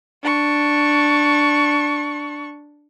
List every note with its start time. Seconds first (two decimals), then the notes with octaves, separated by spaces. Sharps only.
0.23 D4 C#6